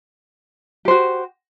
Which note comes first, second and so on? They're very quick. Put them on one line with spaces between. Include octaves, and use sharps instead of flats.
G4 C5 F#4